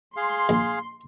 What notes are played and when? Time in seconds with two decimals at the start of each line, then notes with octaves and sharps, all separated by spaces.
0.17 G#4 F5 C6
0.49 A#1